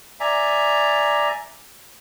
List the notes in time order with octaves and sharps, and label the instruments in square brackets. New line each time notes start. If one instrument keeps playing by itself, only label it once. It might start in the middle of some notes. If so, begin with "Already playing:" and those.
[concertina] D5 E5 G#5 A#5